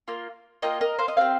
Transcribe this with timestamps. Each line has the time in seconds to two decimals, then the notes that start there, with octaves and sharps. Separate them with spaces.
0.08 A#3 F4
0.62 A#3 F4 D#5 G5
0.81 A#4 D#5
0.99 C5 F5
1.08 D#5
1.17 C4 G4 C5 F5